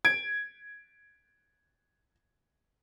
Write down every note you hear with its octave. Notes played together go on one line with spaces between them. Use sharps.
G#6 D7